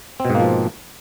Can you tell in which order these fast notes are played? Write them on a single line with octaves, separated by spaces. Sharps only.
C4 B2 G#2 A#3 F3